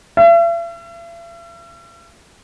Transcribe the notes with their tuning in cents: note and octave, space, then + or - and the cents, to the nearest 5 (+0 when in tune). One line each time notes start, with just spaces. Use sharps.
E5 +45